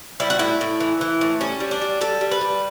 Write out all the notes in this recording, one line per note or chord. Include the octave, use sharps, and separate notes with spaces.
G3 E4
F#4
A2 E4
A2
E3
E3
A2
G3 C#4
G3
D4
G3
G3 A4
G3
B4
G3